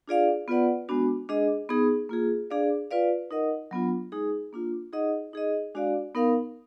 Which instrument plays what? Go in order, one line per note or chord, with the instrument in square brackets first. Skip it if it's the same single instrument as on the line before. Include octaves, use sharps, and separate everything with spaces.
[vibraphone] D4 F4 G#4 D5 F5
B3 F4 B4 D5 F#5
G#3 B3 D4 F#4
G#3 D4 G#4 D#5
B3 D#4 G#4
A#3 F4 G#4
D4 G#4 D5 F5
F4 B4 D5 F5
D#4 A#4 D#5 F#5
F#3 B3 D4 F4
G#3 D#4 G#4
A#3 D4 F4
D#4 G#4 D#5 F#5
D#4 G#4 D#5
G#3 D4 F#4 D5 F5
B3 D#4 A#4 F5